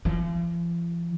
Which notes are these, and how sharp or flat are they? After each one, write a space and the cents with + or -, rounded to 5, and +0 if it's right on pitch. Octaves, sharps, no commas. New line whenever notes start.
F3 -45